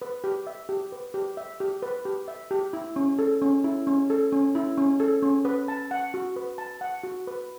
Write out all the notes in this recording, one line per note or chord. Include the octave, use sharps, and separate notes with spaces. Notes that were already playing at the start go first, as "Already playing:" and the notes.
B4
G4
E5
G4
B4
G4
E5
G4
B4
G4
E5
G4
E4
C#4
A4
C#4
E4
C#4
A4
C#4
E4
C#4
A4
C#4
B4
A5
F#5
F#4
B4
A5
F#5
F#4
B4